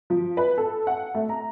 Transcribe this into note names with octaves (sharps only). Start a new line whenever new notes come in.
F3
B4
A4
F#5
A3
A#5